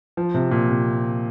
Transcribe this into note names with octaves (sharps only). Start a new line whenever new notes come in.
F3
C3
A#2
C3